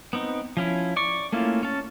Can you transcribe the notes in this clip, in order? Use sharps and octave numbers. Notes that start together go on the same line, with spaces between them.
B3 C4 D#4
F3 C#4 E4
D5 C#6
A3 A#3 C#4 E4 F4
C#4 A5